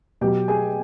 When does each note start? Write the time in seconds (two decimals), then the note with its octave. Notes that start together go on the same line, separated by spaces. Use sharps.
0.21 B2 F#3 G4 G5
0.48 G#4 G#5